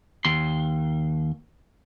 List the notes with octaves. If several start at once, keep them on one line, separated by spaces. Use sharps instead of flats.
D#2 C6